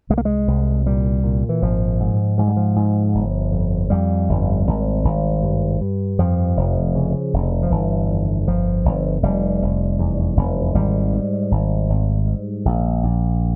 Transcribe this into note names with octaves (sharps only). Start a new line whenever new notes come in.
C2 G#3
A#3
G#3
C2
A#2 G3
A#2
E3
G#1 F3
G#2
G#2 F3
G3
F3
G#2
G1
F2
F2 G3
G1
G#1
G#1
G2
G2
F2 F3
F1
C#3
F1
F3
G1 E3
F2
G1 F3
G1
F1 G3
F1
E2
F1
G#1 G3
G#2
G#1
G#1
G#2
A#1
A#1